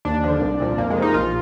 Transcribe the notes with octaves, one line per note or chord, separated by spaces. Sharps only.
D#2 D4
D3 F3
C2
A#2 F3
F2 A#3
G#3
C3 F3
D#4
A#1 F4